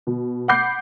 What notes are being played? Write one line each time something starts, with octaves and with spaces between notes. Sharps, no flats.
B2
F#5 B5 D6 G6 C7